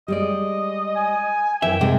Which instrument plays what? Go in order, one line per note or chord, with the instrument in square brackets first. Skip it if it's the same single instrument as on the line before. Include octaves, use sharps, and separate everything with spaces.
[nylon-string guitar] G3 G#3 D5 [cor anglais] D#5
[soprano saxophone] G#5
[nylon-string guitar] F#2 E3 [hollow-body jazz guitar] E5 [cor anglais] G5
[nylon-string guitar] G#2 G3 G#3 [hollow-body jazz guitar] C3